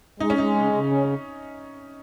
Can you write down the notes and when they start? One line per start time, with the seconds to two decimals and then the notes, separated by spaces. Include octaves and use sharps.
0.20 G#3 D#4
0.30 C#4
0.38 G#3 D#4
0.56 C#3
0.73 C#3
0.91 C#4